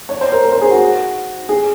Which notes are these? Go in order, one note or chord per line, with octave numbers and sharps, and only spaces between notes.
C#5
C5
A#4
A#4
C5
G#4
F#4
G#4